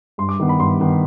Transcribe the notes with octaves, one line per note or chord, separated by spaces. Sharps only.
G2 C6
D6
D#3 B3
B5
G2 C6
D#3 B3